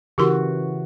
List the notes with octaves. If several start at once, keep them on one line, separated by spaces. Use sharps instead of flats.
C#3 E3 F#4 G4 A#4 C6